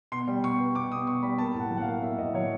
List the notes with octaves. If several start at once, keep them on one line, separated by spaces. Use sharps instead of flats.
B2 C6
G3
B2 C#6
B3
B2 D6
B2 D#6
B2 C#6
G3 B5
A#3 A5
A2
F#5
F#3
F#5
F5
A#3
A#3 E5
A2 D#5
F#3 C#5